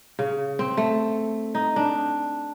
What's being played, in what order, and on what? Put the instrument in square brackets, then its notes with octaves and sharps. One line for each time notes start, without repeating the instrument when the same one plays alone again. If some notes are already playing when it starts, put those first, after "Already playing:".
[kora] C#3
C4
A3
D#4
D4